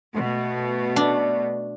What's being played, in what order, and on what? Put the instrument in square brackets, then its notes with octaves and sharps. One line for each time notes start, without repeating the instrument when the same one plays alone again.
[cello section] B2 A3
[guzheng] D4